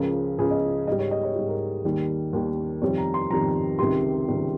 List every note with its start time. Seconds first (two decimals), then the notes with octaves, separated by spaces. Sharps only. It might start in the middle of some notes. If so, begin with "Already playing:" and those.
Already playing: C#2 C#3 F3 A#4
0.38 C#2 C#3 F3 G#4
0.51 D#5
0.87 G#2 D#5
0.92 G3
0.99 C#5
1.11 D#5
1.23 C#5
1.36 G#2 G3
1.48 A#4
1.85 D#2 D#3 G3
2.33 D#2 D#3 G3
2.82 F2 C3 D#3 G3 C#5
2.98 A#5
3.14 C6
3.31 F2 C3 D#3 G3 A#5
3.79 C#2 C3 D#3 G3 C6
4.28 C#2 C3 D#3 G3